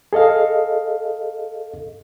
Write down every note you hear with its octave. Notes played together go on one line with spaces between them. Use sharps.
G#4 A4 D#5 F5